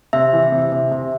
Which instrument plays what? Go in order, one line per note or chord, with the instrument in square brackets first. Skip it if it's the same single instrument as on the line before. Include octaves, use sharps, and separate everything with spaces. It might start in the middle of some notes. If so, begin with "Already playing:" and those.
[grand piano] C3 [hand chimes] E5
[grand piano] E3
C3
C3
C3